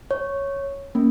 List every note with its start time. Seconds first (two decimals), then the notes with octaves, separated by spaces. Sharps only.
0.11 C#5
0.95 A#3 C#4